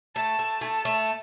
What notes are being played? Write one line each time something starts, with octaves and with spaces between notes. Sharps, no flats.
A3 A5
A3
A3 A5
A3